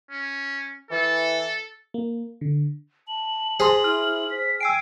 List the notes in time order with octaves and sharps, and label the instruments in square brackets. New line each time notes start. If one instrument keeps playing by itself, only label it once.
[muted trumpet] C#4
[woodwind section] E3 [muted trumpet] A4
[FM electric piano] A#3
D3
[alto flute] A5 [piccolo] F#7
[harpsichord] G#4 [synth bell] C5 C6
[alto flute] E4 [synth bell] F6
[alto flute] C5 [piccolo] B6
[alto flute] G5 [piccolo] G#5 [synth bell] E6 C7 D7